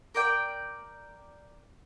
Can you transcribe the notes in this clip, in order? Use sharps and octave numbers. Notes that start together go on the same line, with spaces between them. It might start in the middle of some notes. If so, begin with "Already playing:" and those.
A#4 D5 G5